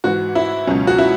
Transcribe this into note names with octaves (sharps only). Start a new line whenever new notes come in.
G#2 E3 F#4
E4
C#2 B2 F#3 C#4
F#4
E4